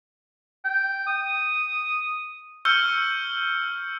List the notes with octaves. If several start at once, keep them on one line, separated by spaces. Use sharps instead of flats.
G5
D#6
C#6 E6 F6 G6 C#7 G7